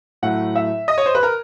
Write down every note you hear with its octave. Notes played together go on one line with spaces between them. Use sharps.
A2 F#3 A3 F#5
E5
D#5
C#5
C5
B4
A#4